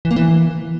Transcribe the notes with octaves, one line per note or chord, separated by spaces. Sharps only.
E3
A#3
E3